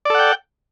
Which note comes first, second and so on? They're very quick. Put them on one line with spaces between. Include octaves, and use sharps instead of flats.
D5 A4 F#5 G5